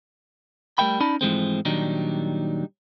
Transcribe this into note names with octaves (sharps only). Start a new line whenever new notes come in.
G3 A3 A#4 E5 G5 B5
C#4 D#4 D5 A5 B5
G#2 E3 F3 G#3 A3 C4
A#2 D#3 F#3 G3 D4 D#4